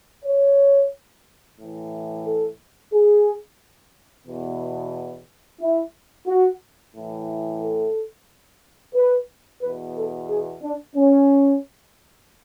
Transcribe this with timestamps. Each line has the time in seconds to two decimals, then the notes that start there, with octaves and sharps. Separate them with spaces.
0.25 C#5
1.59 A2 E3
2.25 A4
2.92 G#4
4.27 E2 B2
5.61 E4
6.27 F#4
6.94 A2 E3
7.61 A4
8.95 B4
9.61 E2 B2 B4
9.95 A4
10.29 G#4
10.63 D4
10.96 C#4